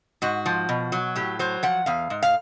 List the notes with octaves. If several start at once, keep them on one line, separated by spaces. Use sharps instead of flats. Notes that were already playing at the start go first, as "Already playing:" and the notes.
G#2 F#4
F3
B2
F#3
A2 G4
F#3 C5
F3 F#5
E2 F5
G#2
F5